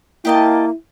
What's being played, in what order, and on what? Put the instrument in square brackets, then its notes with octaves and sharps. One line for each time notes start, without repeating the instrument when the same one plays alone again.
[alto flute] A#3 [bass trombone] E4 [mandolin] G4 D#5 A5